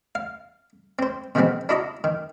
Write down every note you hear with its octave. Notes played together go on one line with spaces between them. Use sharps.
F5
C4 C5
B2 D#3 F3 G#3 B3 C4
D4 E4 F#4 D#5 A#5
D#3